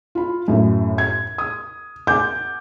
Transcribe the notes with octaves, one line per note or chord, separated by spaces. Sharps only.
F4 B5
F#2 A2
G#6
D#6
F#5 G#5 D6 G6